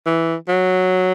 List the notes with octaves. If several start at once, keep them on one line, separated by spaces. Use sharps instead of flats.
E3
F#3